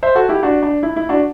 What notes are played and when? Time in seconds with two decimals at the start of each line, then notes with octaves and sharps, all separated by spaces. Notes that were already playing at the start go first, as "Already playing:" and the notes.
0.03 C5 E5
0.15 F#4 A4
0.29 E4 G4
0.43 D4 F#4
0.63 D4
0.83 E4
0.96 E4
1.09 D4 F#4